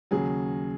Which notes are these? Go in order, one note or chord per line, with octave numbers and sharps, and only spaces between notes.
D#2 C#3 F#3 G#4